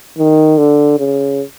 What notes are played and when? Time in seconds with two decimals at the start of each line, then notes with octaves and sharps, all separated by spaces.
0.18 D#3
0.58 D3
0.99 C#3